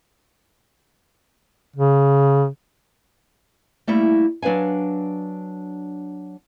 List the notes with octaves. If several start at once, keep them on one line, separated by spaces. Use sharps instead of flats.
C#3
G3 A3 A#3 E4
F#3 D4 B4 F5 G#5